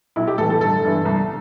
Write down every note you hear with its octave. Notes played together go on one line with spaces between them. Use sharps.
B1 E4
G4
A2 E3 A4
A4
G1 A4
G2 E3
C2